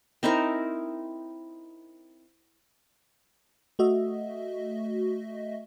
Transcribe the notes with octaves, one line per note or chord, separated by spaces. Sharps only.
C4 D#4 E4 A#4
A3 F#4 D#5 E5